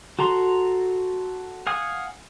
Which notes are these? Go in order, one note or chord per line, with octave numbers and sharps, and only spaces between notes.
F#4 A4 A#5 C6
F5 F#5 G#5 D#6